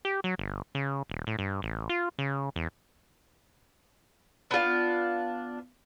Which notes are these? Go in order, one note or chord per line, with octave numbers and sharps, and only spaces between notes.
G4
F#3
G1
C#3
D#1
A2
G2
A1
F4
C#3
E2
B3 D4 F4 F5